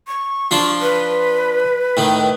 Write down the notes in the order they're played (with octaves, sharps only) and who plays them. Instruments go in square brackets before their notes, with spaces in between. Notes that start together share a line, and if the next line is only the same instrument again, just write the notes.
[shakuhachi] C#6
[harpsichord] F3 D4 F4
[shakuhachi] B4
[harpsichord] A2 D#3